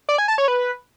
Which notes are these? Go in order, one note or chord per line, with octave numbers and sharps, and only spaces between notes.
D5
G#5
A5
C#5
B4